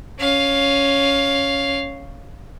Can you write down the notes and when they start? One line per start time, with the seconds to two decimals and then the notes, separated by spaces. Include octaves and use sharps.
0.19 C#4 F5